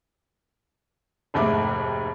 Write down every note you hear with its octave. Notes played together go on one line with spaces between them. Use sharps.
F1 D#2 G#2 A3 D6